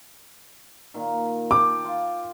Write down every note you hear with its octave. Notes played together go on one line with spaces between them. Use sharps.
A#2 D#3
G5 A5 D6
F4